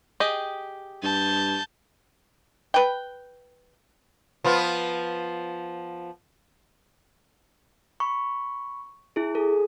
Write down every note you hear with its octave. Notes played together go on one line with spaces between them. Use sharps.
G4 G#4 D#5
G2 A5 G6
B4 G5
F3 B3 F4
B5 C#6
E4 G#4
G#4 A4